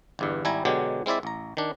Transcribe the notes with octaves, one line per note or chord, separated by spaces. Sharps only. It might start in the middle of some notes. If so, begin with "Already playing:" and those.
G1 E2 G2
G#1 G3 E4 G#5 A#5
B2 D3 F#3 G#3 G4
G#3 C4 E4 D5 E5
A1 A#5
D#3 D4